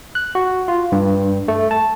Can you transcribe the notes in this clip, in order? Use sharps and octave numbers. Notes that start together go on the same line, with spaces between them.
F#6
F#4
F4
G2
A3
A5